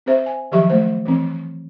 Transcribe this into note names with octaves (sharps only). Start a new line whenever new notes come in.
C4 G#4 C5 E5
G#5
D#3 F3 F#3 G4 E5 C#6
A3 C5
E3 C4